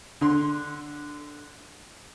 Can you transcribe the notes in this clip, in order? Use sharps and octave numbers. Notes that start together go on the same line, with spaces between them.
D3 C6